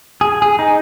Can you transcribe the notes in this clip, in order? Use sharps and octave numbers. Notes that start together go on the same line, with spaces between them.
G#4
G#4
D#4